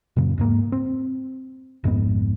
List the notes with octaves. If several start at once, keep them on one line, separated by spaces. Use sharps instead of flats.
F#2 A#2 C#3
E2 G#2 A#3
C4
A#1 F2 G#2 B3